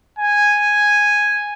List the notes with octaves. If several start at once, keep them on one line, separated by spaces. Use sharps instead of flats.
G#5